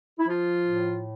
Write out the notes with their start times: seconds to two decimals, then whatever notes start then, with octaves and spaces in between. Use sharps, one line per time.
0.19 E4
0.25 F3 F4
0.66 A2